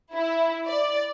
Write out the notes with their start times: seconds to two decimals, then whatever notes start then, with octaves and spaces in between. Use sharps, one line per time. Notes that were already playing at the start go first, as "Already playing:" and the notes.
0.13 E4
0.66 D5